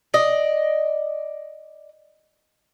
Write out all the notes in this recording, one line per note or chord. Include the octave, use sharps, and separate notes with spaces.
D5 D#5